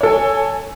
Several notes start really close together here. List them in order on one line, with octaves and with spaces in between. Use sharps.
C#5 A4 G#5